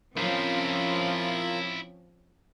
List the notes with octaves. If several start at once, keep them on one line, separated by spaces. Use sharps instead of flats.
F3 C4 C#4 E4 F4 A#4 C5